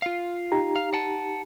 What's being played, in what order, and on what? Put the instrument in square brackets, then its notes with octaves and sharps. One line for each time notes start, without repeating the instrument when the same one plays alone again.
[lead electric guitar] F4 F5
[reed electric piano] D#4 G4 A#5
[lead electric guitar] F5
F#5 A5